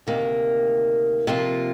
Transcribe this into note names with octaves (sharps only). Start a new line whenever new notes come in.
D2 C3 D#3 A#3
C3 F3 A#3 F4